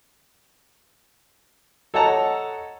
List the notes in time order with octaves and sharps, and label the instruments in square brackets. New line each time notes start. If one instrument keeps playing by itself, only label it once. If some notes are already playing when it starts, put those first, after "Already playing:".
[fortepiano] A4 C#5 D#5 F#5 A5 A#5